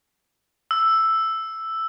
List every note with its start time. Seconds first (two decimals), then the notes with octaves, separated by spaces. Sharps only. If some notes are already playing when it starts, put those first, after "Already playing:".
0.71 E6